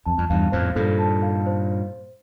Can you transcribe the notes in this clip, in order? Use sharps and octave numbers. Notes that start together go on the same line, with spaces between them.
F2 A5
F2
E2 G2 F5
F2 A2 C5
G2 A#2 A4
A5
F5
C5